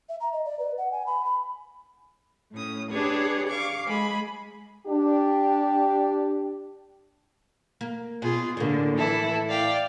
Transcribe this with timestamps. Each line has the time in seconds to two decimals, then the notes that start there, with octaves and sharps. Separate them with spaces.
0.09 E5
0.20 A#5
0.33 D#5
0.45 D5
0.59 B4
0.78 F#5
0.92 G#5
1.06 B5
1.25 B5
2.52 A2 C#4 D#6
2.91 D4 G4 G#4 B4 C#5
3.48 F5 C#6 D6
3.88 G#3 G#4 B5
4.86 D4 G4
7.81 A#3
8.22 B2 F4 G#4
8.57 A2 D3 A#3
8.97 E3 E4 A4
9.48 D5 F5 G5